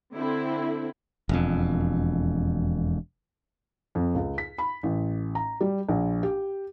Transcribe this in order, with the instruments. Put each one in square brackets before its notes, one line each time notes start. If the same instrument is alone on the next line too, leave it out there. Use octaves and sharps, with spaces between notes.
[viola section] D3 C4 E4
[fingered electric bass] E1 F2
[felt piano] F2
C#2
B6
B5
A1
A#5
G3
A#1
G4